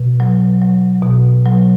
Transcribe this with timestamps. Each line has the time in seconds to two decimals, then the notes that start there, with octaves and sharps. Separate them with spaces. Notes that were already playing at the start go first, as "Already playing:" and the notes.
Already playing: B2
0.20 F#3
0.61 F#3
1.03 B2
1.46 F#3